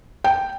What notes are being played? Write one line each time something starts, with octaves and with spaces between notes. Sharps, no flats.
G5